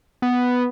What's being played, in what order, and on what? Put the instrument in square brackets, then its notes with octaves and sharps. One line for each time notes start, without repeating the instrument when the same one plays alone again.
[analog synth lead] B3